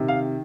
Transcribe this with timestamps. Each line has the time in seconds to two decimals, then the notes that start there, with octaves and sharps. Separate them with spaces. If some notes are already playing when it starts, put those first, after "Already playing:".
Already playing: C3 D#3
0.08 F5